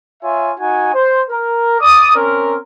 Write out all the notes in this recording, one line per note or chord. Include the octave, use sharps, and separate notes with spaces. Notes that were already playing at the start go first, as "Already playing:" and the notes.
F4 C#5 E5 G#5
D#4 F#4 G#5
C5
A#4
D5 D6 D#6
C4 C#4 A#4